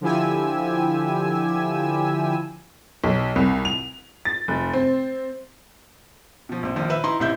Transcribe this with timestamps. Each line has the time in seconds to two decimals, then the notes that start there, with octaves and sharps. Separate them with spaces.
0.01 D3 F3 E4 G4 G#5 E6
3.04 B1
3.36 C2
3.65 F7
4.25 A6
4.48 F1
4.73 C4
6.49 B2 F3
6.63 A#1 C4
6.76 A#1 D#3 F3
6.90 B4 E5 B5 E6
7.04 D#4 E4 A#5 C6
7.20 A1 C3 E4 E5 G6